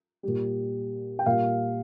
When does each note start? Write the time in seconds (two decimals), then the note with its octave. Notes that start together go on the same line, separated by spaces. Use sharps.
0.23 A#2 G3
1.19 G5
1.26 A#2 G3 F5